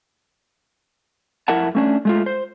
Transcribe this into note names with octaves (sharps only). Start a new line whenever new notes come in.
F2 E4 A#4 E5 F#5 A5
A3 C#4 D4
G#3 A3 F4
C5